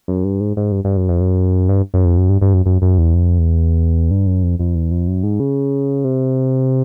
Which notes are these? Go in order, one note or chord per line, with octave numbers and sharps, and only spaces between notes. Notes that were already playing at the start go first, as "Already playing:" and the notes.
F#2
G2
G#2
G#2
G2
G2
F#2
F2
F#2
G2
F#2
F2
F#2
G2
G2
F#2
F#2
F#2
E2
F2
E2
G2
F#2
F2
F2
E2
F2
F#2
G#2
C#3
C3